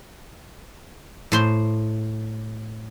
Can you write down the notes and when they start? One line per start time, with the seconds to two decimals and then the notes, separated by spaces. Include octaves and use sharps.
1.32 A2 C5 C6